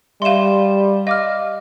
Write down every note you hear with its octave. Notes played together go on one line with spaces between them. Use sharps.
G3 E5 F5 C6 E7
D#5 F5 D6 F6